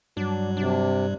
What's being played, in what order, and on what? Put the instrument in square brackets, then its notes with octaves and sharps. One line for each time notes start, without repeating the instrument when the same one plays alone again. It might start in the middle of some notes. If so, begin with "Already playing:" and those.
[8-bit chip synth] G2 G3 [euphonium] F#3 [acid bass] D4
[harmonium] C3 [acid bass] D4